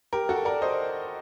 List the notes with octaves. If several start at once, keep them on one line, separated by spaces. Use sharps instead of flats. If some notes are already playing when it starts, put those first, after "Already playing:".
G4 A#4
F#4 A4
A#4 D5
C5 D#5